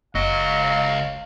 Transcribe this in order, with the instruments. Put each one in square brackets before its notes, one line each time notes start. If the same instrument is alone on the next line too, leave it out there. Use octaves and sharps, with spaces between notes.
[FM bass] F#1 [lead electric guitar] C#2 D#5 [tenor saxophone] F#3 [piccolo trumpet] F5